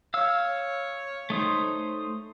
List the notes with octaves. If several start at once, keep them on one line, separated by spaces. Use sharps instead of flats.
C#5 F5 E6
A3 D#4 C5